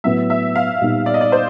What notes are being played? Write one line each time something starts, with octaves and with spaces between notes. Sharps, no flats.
A2 F#3 B3 E5
E5
F5
A#2 G3 B3 D#4
D5
D#5
D5
C5